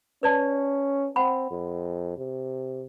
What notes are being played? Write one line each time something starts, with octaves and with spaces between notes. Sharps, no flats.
C#4 B4 D5 A5
C4 F#5 B5
F2
C3